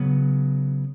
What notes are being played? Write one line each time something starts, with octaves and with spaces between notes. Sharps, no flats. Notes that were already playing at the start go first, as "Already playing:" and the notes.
Already playing: C#3 F#3 B3